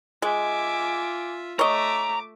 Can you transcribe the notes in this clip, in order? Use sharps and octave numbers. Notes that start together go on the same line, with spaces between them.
G#3 F4 E5 G#5 D6
A3 C#5 D#5 E5 A#5 D6